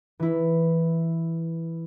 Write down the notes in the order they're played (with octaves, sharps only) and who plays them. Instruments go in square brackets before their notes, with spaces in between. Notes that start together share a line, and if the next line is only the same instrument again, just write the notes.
[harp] E3 E4